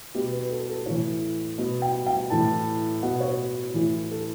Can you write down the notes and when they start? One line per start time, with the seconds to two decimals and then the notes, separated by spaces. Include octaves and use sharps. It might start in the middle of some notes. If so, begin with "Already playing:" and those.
0.15 B2 G4
0.32 B4
0.50 A4
0.69 A4
0.86 A2 E3 C#5
1.58 B2
1.82 G5
2.07 G5
2.30 A2 E3 A5
3.02 B2 F#5
3.20 C#5
3.74 A2 E3
4.11 A4